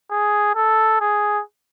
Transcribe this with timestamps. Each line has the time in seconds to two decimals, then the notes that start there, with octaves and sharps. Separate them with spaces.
0.10 G#4
0.55 A4
1.01 G#4